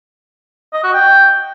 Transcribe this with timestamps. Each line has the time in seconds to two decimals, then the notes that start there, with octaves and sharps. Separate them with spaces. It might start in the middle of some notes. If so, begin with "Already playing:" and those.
0.73 D#5
0.83 F#4
0.94 G5